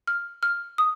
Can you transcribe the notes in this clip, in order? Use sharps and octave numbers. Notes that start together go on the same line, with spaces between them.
F6
F6
D#6